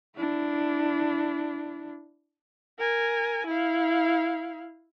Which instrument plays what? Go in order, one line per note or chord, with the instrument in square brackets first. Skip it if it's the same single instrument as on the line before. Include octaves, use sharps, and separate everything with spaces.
[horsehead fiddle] D4 E4
[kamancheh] A#4 G#5
E4 F5